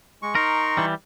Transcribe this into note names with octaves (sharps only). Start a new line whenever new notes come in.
G#3 C#6
D#4 A#4 C6 C#6
E3 G3